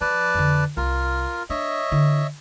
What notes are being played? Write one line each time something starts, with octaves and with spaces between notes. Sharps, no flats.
F3 B4 D5 A5
F2 D3
C2 F4 A#4
D4 C#5 D#5 E5
D3 E4